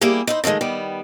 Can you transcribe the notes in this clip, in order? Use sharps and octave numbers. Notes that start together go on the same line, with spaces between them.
G3 A#3 E4 G4 G#4
D#4 E4 C5
D3 D#3 F3 G#3 A3
D#3 G3 B3